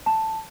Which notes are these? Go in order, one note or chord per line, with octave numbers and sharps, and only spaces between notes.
A5